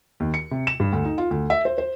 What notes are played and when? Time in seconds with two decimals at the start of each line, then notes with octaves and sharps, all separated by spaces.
0.20 D#2
0.34 C#7
0.51 C3
0.67 E7
0.80 G2
0.92 D2
1.05 D#4
1.18 F4
1.31 D2
1.50 E5
1.65 C5
1.78 C5